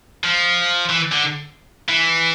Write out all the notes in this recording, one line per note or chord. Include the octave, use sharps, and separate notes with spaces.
F3
E3
D3
E3